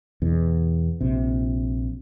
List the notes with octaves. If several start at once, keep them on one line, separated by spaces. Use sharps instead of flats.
E2 B2
A#1 C3